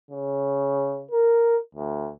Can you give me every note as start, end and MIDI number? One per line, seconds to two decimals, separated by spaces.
0.11 1.03 49
1.11 1.57 70
1.75 2.10 38